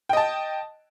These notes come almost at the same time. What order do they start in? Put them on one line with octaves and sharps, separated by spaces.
G5 D#5 A5